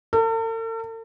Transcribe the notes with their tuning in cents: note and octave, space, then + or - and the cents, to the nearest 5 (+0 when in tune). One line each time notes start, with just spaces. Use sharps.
A4 +45